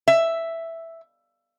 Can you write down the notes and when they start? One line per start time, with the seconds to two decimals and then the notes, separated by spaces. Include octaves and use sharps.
0.08 E5